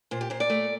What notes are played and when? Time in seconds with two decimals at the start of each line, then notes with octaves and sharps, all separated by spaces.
0.11 A#2 C5
0.21 G4
0.30 A#2 C5
0.40 D5
0.50 A3